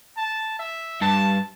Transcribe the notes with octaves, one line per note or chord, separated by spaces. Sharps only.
A5
E5
G2 A5